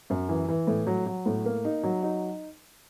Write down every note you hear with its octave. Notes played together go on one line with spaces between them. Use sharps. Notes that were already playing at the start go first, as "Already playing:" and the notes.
F#2
E3
E3
A2
F#3
F#3
A2
A#3
D#4
F#3
D#4